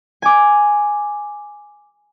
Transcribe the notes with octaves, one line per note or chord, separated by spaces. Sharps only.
G#5 D6